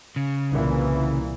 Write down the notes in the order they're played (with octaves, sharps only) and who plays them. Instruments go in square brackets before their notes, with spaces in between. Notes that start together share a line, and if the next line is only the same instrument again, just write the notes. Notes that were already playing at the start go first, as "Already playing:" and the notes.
[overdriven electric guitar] C#3
[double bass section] C2 A#2 E3